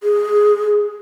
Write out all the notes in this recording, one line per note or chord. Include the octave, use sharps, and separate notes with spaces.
G#4